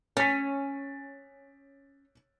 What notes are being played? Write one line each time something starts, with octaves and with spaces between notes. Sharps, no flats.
C#4 A6 B6